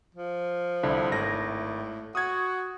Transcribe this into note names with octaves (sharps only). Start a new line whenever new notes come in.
F3
C2 D3 E4
G#1 A2 A#6
F#4 D#6 G#6